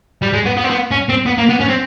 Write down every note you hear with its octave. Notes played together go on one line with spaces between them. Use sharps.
G3
G#3
B3
B3
C4
B3
C#4
C4
B3
A#3
B3
C#4
C4